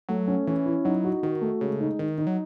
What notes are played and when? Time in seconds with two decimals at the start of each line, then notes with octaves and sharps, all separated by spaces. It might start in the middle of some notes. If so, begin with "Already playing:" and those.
0.09 F#3 A3
0.28 C#4
0.47 E3 C#4
0.65 E4
0.85 F#3 D#4
1.04 F#4
1.23 D#3 F#4
1.41 A3
1.61 C#3 G#3
1.80 D#4
1.99 D#3 D#4
2.18 D#4
2.27 F#3